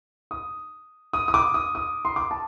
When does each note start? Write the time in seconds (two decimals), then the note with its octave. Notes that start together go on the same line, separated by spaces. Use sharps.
0.31 D#6
1.13 D#6
1.28 D#6
1.34 D6
1.54 D#6
1.75 D#6
2.05 C6
2.16 D6
2.31 A5